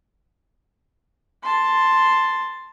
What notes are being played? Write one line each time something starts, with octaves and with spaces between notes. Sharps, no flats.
A5 C6